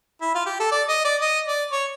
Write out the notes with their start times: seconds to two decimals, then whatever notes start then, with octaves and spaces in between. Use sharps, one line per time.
0.22 E4
0.35 F4
0.46 G4
0.60 A4
0.72 D5
0.89 D#5
1.05 D5
1.21 D#5
1.47 D5
1.72 C#5